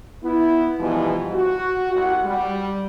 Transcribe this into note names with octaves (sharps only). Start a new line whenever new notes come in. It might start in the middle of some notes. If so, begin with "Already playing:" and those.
B3 E4
G#2 B2 E3 F3 G3
F#4
C2 G3 F#5
G3